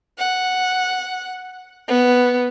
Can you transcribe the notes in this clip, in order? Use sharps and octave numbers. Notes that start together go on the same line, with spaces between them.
F#5
B3